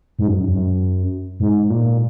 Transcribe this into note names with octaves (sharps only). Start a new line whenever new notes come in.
G#2
F#2
F#2
G#2
A#2